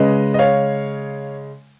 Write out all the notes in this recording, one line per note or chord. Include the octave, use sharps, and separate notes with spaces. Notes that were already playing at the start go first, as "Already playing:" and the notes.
Already playing: C#3 G#3 B4 D#5
D#5
C#5 F5